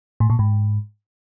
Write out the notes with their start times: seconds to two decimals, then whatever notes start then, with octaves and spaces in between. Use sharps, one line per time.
0.20 A2
0.30 A#2
0.39 G#2